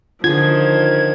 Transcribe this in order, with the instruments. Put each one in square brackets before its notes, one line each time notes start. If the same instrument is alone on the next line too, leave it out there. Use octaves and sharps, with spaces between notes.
[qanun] D3 G#4 [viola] D#3 F3 [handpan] F4 [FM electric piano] G#6